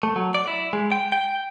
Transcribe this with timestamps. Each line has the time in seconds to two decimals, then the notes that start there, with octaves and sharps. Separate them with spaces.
0.03 A3
0.16 F#3
0.35 D5
0.48 E4
0.73 G#3
0.92 G5
1.12 G5